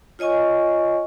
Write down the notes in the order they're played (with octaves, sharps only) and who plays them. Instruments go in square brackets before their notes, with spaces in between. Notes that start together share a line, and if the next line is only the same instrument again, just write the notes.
[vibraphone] F4 C#5 D#5 G#5 C#6